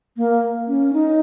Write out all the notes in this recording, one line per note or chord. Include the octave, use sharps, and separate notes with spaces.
A#3
C#4
D#4